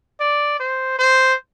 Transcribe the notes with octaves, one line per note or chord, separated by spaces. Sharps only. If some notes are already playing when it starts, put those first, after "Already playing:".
D5
C5
C5